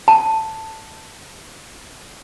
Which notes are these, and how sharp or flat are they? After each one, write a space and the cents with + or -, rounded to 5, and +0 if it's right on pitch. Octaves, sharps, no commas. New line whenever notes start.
A5 +5